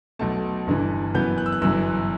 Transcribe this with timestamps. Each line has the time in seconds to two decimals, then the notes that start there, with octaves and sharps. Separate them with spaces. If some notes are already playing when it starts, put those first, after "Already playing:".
0.19 B1 B2 A3 A5
0.67 G1 G2 E3
1.14 F#2 E3 B3 G6
1.38 F#6
1.46 E6
1.52 F#6
1.61 G1 F#2 E3 E6